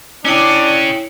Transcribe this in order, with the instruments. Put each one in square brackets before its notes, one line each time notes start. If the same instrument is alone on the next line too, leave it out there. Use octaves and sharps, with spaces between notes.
[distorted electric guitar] C#4 G#4 [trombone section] D4 [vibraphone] E4 C#5 G5